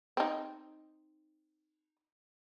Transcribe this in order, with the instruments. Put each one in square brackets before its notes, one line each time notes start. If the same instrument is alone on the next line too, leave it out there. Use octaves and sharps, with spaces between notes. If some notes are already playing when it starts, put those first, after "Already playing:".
[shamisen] C4 D#4